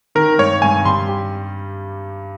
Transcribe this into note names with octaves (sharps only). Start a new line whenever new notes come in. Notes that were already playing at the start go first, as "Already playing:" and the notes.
D#3 A#4
G2 C#5
G2 G#5
G3 C6
G4